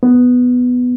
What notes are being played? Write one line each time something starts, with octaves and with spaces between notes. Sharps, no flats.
B3